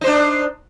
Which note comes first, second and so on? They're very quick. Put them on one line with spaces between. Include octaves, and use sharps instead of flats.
D#4 C5 D4